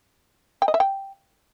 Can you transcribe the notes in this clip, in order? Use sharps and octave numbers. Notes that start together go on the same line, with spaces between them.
G5
D#5
E5
G5